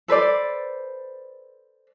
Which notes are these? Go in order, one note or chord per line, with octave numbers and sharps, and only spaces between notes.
A4 B4 C5 D5